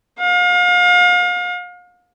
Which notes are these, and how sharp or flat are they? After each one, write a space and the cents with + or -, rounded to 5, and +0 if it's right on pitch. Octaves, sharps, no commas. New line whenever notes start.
F5 +35